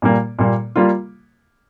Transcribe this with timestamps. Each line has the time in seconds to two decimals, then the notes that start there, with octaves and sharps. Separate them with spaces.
0.02 A#2 G3 A#3
0.39 A#2 G3 A#3
0.76 G3 A#3 F4